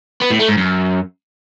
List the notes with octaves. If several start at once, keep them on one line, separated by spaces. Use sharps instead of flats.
B3
A2
A3
G#2
F#2